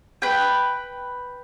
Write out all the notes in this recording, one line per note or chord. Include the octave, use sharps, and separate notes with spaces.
B4 G5